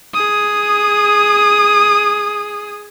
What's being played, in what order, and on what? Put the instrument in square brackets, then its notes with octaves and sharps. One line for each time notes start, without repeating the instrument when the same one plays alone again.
[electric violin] G#4 D#6